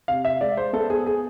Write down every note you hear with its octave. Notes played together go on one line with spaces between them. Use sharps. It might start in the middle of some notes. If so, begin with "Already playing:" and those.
C3 F5
E5
G#3 D5
C5
B3 A4
G#4
G#4